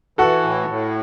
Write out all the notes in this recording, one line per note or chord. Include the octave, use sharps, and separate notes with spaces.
E3 F#4 A4
A2
A2